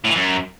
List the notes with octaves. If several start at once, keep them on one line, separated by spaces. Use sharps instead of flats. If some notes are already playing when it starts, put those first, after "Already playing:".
A2
E3
F#2